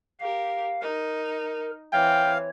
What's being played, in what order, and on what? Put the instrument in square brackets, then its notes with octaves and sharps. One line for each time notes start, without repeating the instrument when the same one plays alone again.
[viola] G4 A#4 [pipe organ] F5
[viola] D#4 [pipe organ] A#4
[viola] E3 C4 [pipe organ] C#5 [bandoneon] F5 [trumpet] G5